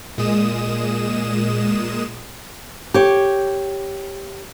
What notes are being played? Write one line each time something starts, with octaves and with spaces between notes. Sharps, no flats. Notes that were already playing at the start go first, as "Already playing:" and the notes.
A#2 G#3 D#6 E7
G4 C#5